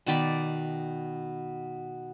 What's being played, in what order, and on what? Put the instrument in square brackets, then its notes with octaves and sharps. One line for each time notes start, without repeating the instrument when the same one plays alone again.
[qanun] B2 D#3 D5 B5